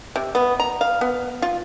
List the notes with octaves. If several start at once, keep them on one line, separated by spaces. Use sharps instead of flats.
C3
B3
A#5
F5
B3
F4